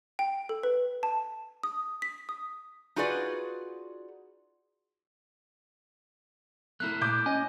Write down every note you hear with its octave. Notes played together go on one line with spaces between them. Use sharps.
G5
A4
B4
A5
D#6
B6
D#6
D#4 F4 F#4 G#4 B4 D5
A3 A#3 E4 F#6
A#2 D6 G6
C#4 D#5 G#5